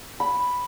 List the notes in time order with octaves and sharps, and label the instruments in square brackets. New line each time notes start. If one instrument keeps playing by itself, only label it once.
[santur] B5